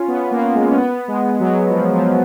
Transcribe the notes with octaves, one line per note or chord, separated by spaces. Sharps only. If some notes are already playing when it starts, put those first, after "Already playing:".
Already playing: C#4 F4
B3
A#3
G#3
C#4
B3
G#3
F#3
F3
F3